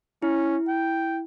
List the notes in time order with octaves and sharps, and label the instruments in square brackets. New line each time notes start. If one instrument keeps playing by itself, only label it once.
[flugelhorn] C#4 [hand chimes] E4
[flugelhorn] G5